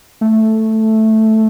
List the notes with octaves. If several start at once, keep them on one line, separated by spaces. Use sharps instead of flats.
A3